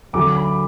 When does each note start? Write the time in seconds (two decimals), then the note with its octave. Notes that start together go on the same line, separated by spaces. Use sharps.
0.13 D2 D3 F#3 D6
0.36 B5